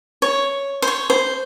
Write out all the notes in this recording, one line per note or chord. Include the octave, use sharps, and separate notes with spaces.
C#5
C5
C#5
C5